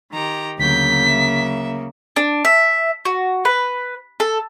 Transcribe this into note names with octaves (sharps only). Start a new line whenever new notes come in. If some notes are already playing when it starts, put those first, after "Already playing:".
D#3 G4 A#5
D2 C#3 F#3 A#3 G6 B6
F#3 E5
D4
E5
F#4
B4
A4